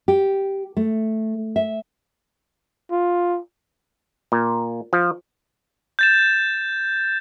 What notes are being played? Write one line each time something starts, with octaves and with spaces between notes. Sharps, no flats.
G4
A3
E5
F4
A#2
F3
G6 A6 E7